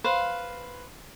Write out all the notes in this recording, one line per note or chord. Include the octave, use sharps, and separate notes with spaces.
B4 C5 F5